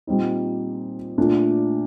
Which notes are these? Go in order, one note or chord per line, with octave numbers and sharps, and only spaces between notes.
A#2 G3 C4 D#4
A#2 A3 D4